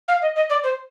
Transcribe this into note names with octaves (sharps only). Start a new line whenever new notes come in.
F5
D#5
D#5
D5
C5